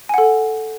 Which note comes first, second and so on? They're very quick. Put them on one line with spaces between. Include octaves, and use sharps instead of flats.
G#5 F#5 A4